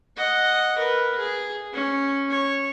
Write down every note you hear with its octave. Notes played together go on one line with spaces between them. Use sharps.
D#5 F#5
A#4 B4
G#4
C#4
C#5